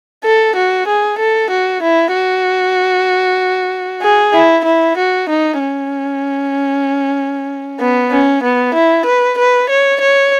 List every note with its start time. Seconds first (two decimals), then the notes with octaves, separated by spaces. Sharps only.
0.25 A4
0.56 F#4
0.87 G#4
1.19 A4
1.50 F#4
1.83 E4
2.13 F#4
4.02 G#4
4.33 E4
4.65 E4
4.97 F#4
5.29 D#4
5.59 C#4
7.80 B3
8.11 C#4
8.43 B3
8.74 E4
9.06 B4
9.38 B4
9.70 C#5
10.01 C#5